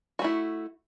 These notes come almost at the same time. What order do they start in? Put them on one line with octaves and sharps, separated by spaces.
F#4 A3 E4